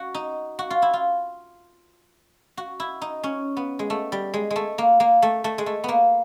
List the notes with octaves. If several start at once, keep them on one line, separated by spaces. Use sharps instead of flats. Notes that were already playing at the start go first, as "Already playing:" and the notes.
Already playing: F#4
D#4
F#4
F4
E4
F4
F#4
E4
D#4
C#4
B3
G#3
A3
G3
G#3
G#3
A3
A#3
A#3
A3
A3
G#3
A3
A#3 B3